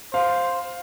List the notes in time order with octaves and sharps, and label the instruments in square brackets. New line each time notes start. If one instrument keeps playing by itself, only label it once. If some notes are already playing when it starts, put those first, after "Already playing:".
[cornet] C5 [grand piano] F5